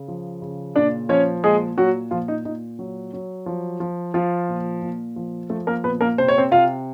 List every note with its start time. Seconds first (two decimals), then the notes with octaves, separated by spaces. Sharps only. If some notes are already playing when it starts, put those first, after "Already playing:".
Already playing: C#3
0.08 F3
0.42 C#3
0.76 A#2 D4 D5
1.09 F3 C#4 C#5
1.44 A#2 G#3 G#4
1.77 A#2 F#3 F#4
2.11 A#2 F3 F4
2.28 D#4
2.45 A#2 D#4
2.79 F#3
3.13 F#3
3.46 F3
3.80 F3
4.14 F3 F4
4.49 A#2
4.82 A#2
5.16 F3
5.50 F3 A3 A4
5.67 A#3 A#4
5.84 A#2 B3 B4
6.01 A#3 A#4
6.18 C3 C5
6.28 C#5
6.38 C4 C5
6.51 C3 F4 F5